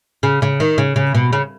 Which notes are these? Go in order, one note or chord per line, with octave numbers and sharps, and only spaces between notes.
C#3
C#3
D#3
C#3
C#3
B2
C#3